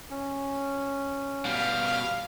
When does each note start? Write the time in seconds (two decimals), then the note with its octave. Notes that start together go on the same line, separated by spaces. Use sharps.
0.10 C#4
1.45 B2 G3 F5